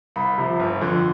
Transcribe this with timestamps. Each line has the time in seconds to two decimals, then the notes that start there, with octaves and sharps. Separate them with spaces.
0.16 C2 B5
0.38 C3 F3
0.59 G1
0.81 F2 D3 F3